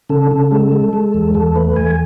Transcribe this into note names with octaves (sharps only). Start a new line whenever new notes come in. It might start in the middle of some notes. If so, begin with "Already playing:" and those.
C#3 A4
C#3
G#3
G#3
G#3
E2
E2 A4
A3 B4
E2 G#5